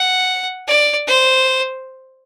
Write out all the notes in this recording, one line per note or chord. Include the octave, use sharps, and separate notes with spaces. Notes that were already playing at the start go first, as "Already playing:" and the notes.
Already playing: F#5
D5
C5